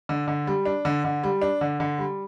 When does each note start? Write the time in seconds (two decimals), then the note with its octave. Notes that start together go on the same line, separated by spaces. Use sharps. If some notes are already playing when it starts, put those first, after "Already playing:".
0.09 D3
0.28 D3
0.47 G3
0.66 D4
0.85 D3
1.05 D3
1.24 G3
1.42 D4
1.61 D3
1.80 D3
1.99 G3